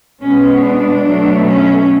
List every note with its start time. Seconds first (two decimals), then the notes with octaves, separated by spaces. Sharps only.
0.24 B2 G#3 B3 C#4
0.65 D4
1.06 B2 F#3 A3
1.47 C#4